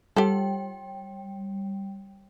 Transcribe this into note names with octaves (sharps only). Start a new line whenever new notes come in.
G3 G4 A4 G5